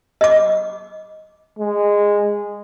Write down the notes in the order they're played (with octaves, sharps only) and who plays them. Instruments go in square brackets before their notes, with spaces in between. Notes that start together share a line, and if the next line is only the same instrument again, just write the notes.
[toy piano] D#5 D6
[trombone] G#3